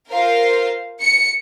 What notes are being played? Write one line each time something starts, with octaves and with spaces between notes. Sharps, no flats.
F4 A#4 C5 F5
C#7